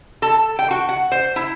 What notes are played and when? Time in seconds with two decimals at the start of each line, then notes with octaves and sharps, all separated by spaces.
0.22 A4
0.59 G5
0.71 F#4
0.89 F#5
1.12 C5
1.36 E4